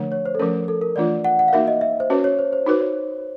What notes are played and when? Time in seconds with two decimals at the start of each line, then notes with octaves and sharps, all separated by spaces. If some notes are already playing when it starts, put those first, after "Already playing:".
Already playing: D3 F3 A3 D4 C#5
0.12 C#5
0.26 C5
0.35 A4
0.39 F3 A3 C#4 A#4
0.68 A4
0.82 A#4
0.96 E3 A3 D4 F4 D5
1.25 F#5
1.39 F#5
1.48 F5
1.53 A#3 D#4 F#4 A#4 E5
1.68 D#5
1.81 E5
2.00 C5
2.10 C#4 F#4 B4 C#5
2.24 C#5
2.39 C5
2.53 C5
2.66 D#4 F#4 B4 C5
2.81 C#5